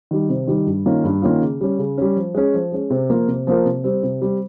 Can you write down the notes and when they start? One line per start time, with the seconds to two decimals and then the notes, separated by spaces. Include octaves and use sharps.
0.11 D#3 G3
0.29 C3
0.47 D#3 G3
0.67 G2
0.86 D#3 A#3 C#4 F4
1.04 G2
1.22 D#3 A#3 C#4 F4
1.41 C#3
1.61 G3 C#4
1.79 C#3
1.98 G3 C#4
2.16 F3
2.35 G#3 C#4
2.54 F3
2.72 G#3 C#4
2.90 C3
3.10 F3 A#3 F4 A#4
3.28 C3
3.47 F3 A#3 F4 A#4
3.65 C3
3.84 G3 C4
4.03 C3
4.22 G3 C4